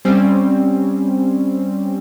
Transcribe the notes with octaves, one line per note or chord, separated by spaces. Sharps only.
G3 C4 C#4